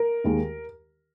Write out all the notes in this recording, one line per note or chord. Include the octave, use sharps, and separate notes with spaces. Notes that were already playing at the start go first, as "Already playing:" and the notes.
Already playing: A#4
D#2 D#3 G#3